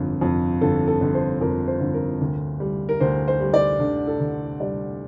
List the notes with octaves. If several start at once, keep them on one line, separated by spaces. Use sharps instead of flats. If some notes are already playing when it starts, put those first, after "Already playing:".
Already playing: G1 F2
F2
G1 A4
A4
G1
C5
F2 A#4
C5
G1
A#4
D2
G3
A#4
D2 C5
C5
G3
D5
D3
A4
D3
G3 D5